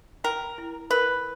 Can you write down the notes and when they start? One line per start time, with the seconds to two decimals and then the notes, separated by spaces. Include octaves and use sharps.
0.24 A#4 G5
0.58 E4
0.90 A#4 B4